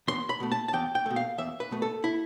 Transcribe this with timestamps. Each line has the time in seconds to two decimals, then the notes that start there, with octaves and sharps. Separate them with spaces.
0.08 E2 C6
0.29 B5
0.40 B2 A3
0.52 A5
0.68 A5
0.73 E2 G5
0.95 G5
1.06 B2 A3
1.16 F5
1.38 E2 E5
1.60 B4
1.71 B2 A3
1.82 A4
2.04 E4